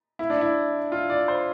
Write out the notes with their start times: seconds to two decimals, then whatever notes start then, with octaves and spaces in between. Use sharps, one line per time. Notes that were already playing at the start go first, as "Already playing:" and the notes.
0.19 E4
0.30 D4
0.41 E4
0.92 F4
1.10 D5
1.28 C5